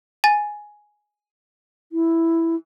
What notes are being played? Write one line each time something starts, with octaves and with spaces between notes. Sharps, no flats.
G#5 A6
E4